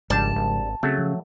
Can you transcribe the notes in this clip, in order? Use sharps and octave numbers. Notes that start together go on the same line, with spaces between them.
G#1 G#2 C#3 F3 G3 D4 A5
G#1
C#3 F#3 A3 C4
F3